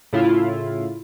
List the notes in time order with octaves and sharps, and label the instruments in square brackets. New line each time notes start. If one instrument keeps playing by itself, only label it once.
[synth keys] A2 C#3 E4 F4